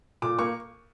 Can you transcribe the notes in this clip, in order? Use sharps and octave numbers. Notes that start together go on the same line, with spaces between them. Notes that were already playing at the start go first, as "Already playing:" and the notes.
A#2 D6
A#3 C#6